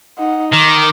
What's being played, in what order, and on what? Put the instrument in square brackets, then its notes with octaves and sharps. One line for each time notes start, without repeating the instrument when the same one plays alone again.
[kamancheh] D#4 F#5
[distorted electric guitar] D#3 [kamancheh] D6